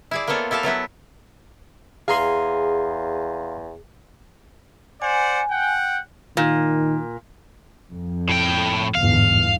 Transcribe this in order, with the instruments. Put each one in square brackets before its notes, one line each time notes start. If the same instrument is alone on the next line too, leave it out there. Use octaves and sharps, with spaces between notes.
[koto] E4 G#4 D5
A#3 B3 F4 A4 C#5
E4 G4 A4 F5 A5
F#3 B3 E4 B4
[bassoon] E2 [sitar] G#4 [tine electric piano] F5 A#5 C6
[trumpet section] C5 D5 F#5 [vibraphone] G#5
[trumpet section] F#5 G5
[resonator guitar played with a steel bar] A#2 [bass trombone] D#3
[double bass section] F2
[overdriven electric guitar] A2 G5
[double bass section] G1 E2 G#2 [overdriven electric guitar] F5